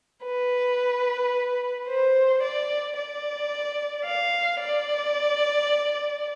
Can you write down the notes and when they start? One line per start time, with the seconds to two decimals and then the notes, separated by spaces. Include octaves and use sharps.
0.25 B4
1.88 C5
2.43 D5
2.97 D5
4.05 F5
4.60 D5